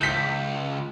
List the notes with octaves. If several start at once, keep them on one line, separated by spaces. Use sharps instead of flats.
C#2 G6 B6